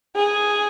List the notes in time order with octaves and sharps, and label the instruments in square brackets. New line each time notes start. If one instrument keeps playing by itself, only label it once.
[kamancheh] G#4